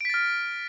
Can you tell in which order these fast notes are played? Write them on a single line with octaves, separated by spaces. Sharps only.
D7 B6 A6 F6